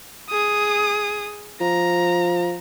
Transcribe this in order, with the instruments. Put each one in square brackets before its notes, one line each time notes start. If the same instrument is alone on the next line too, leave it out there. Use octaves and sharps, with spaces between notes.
[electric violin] G#4 D#6
[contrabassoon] F3 [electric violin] A#5